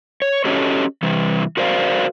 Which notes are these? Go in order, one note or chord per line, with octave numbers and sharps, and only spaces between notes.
C#5
C#4 F#4 G4 A4 C#5 D#5
C3 E3 G3
F#4 A#4 C5 D5 F5